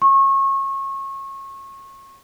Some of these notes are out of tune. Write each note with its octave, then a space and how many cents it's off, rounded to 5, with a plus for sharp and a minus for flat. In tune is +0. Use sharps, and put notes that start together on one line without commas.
C#6 -30